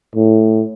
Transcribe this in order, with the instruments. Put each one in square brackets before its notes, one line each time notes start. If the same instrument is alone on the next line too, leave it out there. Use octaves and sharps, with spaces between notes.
[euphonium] A2